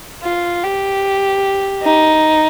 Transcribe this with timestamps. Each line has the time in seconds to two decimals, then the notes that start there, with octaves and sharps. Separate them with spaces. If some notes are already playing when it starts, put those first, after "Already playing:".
0.23 F4
0.63 G4
1.83 D#4